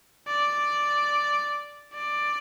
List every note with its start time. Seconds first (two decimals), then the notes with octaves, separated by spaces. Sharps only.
0.27 D5
1.93 D5